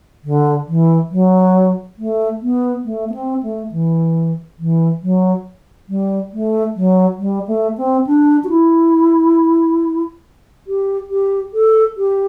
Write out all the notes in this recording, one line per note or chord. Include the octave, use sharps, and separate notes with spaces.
D3
E3
F#3
A3
B3
A3
B3
C4
A3
E3
E3
F#3
G3
A3
F#3
G3
A3
C4
D4
F#4
E4
G4
G4
A4
G4